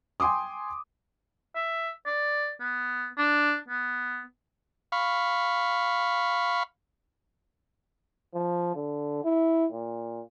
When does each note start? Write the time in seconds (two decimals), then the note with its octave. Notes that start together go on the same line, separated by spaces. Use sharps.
0.20 G5 G#5 C6 D6 D#6
1.56 E5
2.06 D5
2.60 B3
3.18 D4
3.69 B3
4.92 F5 B5 C#6
8.34 F3
8.76 D3
9.24 E4
9.72 A#2